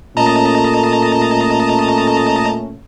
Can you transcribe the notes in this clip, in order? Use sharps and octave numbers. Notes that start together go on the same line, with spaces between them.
A#2 A3 C#4 D#5 A5 A#5